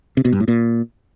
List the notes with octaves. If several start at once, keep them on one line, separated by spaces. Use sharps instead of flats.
C3
B2
G2
A2
A#2